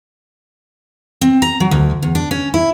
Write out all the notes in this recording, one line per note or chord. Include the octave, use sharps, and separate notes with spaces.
C4
A#5
F#3
D2
E2
D4
C#4
E4